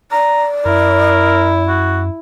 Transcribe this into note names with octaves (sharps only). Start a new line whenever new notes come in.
D5 A#5
F#2 E4 A#4
F#4